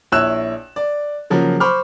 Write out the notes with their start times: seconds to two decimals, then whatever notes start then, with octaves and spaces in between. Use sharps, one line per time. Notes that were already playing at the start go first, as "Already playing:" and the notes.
0.12 A#1 E4 C#5 E6 F#6 E7
0.76 D5
1.30 C#3 F3 F#3 A#3
1.60 C5 B5 C#6 D6 F6